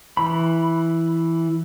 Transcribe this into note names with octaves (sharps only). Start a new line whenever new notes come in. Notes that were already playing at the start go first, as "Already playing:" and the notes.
E3 B5